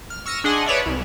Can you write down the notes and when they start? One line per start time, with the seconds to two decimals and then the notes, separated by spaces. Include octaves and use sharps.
0.10 F6
0.26 C#6 E6 F6 A#6 C#7 D#7
0.44 D4 G#4 D#5 F#5 G#5 C6
0.66 B4 C#5 D5 E5
0.86 C2